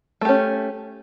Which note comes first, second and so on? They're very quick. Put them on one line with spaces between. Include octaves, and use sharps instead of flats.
A3 G4 C#4